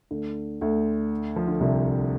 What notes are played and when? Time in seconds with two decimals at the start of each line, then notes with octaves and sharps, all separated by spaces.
0.11 D2 D3
0.61 D2 D3
1.36 F3
1.48 D3
1.61 C2 C3